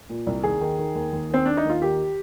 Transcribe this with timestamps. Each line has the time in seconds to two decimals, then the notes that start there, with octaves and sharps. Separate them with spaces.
0.09 A#2
0.27 C2
0.43 D#2 G#4
0.61 D#3
0.78 D#3
0.95 D#2
1.13 D#2
1.30 D#3 C4
1.46 D#3 D4
1.57 D#4
1.65 D#2 F4
1.82 D#3 G4